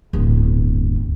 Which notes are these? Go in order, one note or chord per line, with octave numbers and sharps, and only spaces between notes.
D1 G1